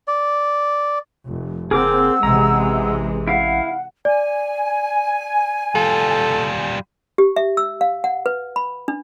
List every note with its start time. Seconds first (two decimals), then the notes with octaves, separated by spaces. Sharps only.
0.08 D5
1.27 F1
1.71 F#1 C4 G#4 A#4 F#5 D6 E6
2.23 A1 C3 E3 G#3 A#5
3.28 E4 F5 F#5
4.05 D5 G#5
5.75 G3 F4 A4
7.18 G4
7.36 E5
7.57 E6
7.81 F5
8.04 F#5
8.26 B4
8.56 B5
8.88 D4